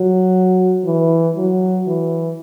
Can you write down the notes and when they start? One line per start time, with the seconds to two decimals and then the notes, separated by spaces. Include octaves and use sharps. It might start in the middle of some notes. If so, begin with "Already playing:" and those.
Already playing: F#3
0.84 E3
1.36 F#3
1.87 E3